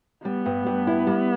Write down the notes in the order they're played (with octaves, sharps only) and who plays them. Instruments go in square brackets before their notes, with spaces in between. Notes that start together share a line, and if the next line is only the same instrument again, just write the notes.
[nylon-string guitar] G3 [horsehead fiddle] B3
[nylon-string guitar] G2
G2
E4
G3